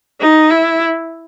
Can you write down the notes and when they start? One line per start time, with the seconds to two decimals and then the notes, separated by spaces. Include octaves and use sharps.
0.21 D#4
0.51 E4